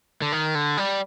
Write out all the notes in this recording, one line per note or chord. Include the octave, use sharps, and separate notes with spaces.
D3
D#3
D3
G3